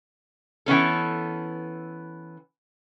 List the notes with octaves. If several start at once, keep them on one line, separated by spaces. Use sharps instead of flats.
E3 B3 C#4 A4